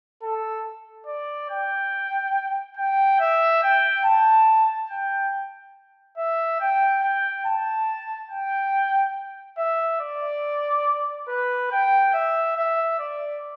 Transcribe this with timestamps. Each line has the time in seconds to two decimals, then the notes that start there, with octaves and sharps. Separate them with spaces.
0.22 A4
1.07 D5
1.49 G5
2.77 G5
3.20 E5
3.63 G5
4.04 A5
4.90 G5
6.17 E5
6.60 G5
7.03 G5
7.45 A5
8.31 G5
9.58 E5
10.00 D5
11.28 B4
11.71 G5
12.14 E5
12.56 E5
12.99 D5